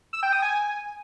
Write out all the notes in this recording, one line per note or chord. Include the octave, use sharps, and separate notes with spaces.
E6
G5
D#6
G#5